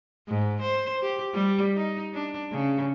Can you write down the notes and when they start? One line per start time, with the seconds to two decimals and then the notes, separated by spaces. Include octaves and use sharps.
0.28 G#2
0.62 C5
1.02 G4
1.34 G3
1.76 D#4
2.14 D4
2.52 C#3